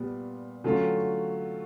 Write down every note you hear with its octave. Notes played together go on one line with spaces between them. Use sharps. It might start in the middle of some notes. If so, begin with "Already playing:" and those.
Already playing: A#2 G3 B3
D3 F#3 A3 C#4 F4